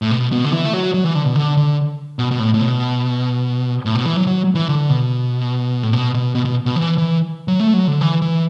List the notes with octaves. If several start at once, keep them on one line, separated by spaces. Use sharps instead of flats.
A2
B2
B2
D3
E3
A3
F#3
F#3
E3
D3
B2
D3
D3
B2
B2
A2
A2
B2
A2
B2
E3
F#3
F#3
E3
D3
B2
A2
B2
B2
B2
B2
B2
E3
E3
F#3
A3
F#3
D3
E3
E3